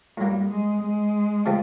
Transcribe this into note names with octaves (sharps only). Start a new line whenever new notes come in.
A2 F#3 G3 A#3
G#3
G#3
C#3 F3 A3 C4